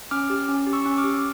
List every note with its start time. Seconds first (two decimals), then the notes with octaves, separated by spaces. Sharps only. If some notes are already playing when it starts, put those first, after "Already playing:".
0.11 C#4 D6 F6
0.30 G4
0.49 C#4
0.67 G4
0.73 C#6 E6
0.86 C#4
0.98 D6 F6
1.04 G4